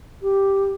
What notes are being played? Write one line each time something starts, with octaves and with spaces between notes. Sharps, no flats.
G4